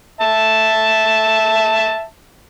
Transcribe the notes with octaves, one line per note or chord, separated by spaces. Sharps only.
E5 A5